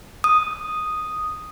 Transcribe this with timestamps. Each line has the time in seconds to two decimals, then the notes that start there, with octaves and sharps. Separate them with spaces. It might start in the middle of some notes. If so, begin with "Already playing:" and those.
0.24 D#6